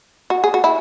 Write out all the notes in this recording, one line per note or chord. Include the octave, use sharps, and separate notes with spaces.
F#4
G#4
F#4
E4